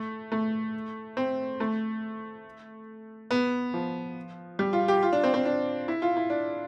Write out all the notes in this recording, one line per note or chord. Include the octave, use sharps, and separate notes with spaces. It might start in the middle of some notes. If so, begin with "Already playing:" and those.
Already playing: A3
A3
C4
A3
B3
F3
G3
F4
G4
F4
D4
C4
C4
D4
E4
F4
E4
D4